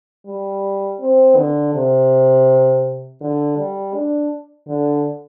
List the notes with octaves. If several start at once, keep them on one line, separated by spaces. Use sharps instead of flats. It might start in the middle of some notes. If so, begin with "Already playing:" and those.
G3
C4
D3
C3
D3
G3
D4
D3